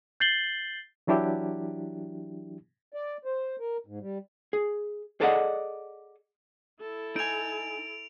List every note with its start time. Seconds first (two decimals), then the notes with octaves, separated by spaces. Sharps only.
0.20 G6 A6 C7 F#7 G7
1.07 E3 F#3 D4 E4 G4
2.94 D5
3.25 C5
3.60 A#4
3.87 G#2
4.01 G3
4.53 G#4
5.20 G#4 A4 D5 D#5 F5 F#5
6.81 E4 A4
7.16 D#4 G#5 D7 F7